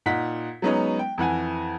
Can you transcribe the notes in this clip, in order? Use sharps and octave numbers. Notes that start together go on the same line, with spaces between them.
A#2 D#4 F#5 B6
F#3 G#3 B3 C#4 D#4
G5
F2 E3 F#5 G#5